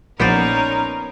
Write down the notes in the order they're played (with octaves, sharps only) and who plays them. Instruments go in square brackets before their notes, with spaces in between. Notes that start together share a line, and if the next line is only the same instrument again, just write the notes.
[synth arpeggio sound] A#1 [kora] B3 C5 D5 [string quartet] C#4 D#4 A#4